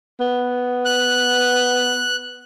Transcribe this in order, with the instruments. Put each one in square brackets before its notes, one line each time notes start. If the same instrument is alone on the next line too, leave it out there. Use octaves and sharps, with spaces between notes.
[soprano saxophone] B3
[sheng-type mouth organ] F#6